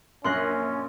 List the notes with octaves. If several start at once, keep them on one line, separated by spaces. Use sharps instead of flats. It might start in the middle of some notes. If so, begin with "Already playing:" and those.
A#1 F#2 A#3 C#4 C6 F#6 A#6